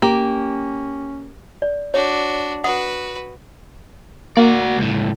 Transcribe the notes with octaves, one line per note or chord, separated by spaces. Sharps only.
A#3 C#4 G4
D5
D4 F#4 C#5
F#4 B4 F#5 D#6
A#3 F#4 D5
C#2 A2